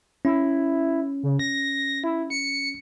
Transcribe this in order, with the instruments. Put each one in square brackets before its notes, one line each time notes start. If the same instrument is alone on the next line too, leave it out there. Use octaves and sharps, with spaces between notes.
[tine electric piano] C#4 [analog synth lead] E4
[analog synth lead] C#3
A#6
E4
C#7